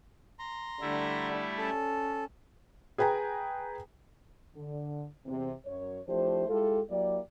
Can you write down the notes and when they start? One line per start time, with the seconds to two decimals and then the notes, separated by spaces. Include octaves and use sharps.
0.39 A#5 C6
0.81 D3 G3 A3 E4
1.58 C#4 A4
2.98 G#4 B4 G5 G#5 A#5
4.56 D3
5.26 E2 C3
5.66 F#2 C#5
6.08 F3 A3 D4 E4 G4 C5
6.49 G#3 E4 F4 G4 A4
6.89 F#3 A#3 E4 G4 D5